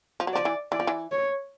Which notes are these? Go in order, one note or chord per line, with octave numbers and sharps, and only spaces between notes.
F3
F#3
F3 D5
E3
E3 D5
F3
E3
C#5